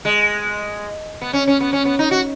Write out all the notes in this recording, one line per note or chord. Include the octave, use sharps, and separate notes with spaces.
G#3
B3
C#4
C#4
B3
C#4
B3
D#4
F#4